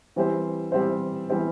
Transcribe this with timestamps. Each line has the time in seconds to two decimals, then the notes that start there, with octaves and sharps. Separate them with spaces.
0.16 E3 G3 C4 G4 C5
0.72 E3 G3 C4 G4 C5
1.30 E3 G3 C4 G4 C5